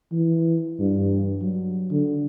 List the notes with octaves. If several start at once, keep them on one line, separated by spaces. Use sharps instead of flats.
E3
G2
F#3
D3